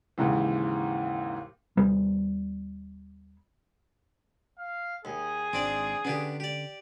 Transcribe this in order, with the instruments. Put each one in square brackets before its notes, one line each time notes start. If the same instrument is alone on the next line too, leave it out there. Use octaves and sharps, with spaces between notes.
[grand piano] D#2 G#2 C#3 E3
[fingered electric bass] D#2 G3 B3
[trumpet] F5
[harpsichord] D#2 [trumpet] G#4
[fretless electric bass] G#1 [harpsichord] C4 D4 D5
[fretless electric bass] D3 C#4 [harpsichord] B3 D4 G4
[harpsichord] G4 D5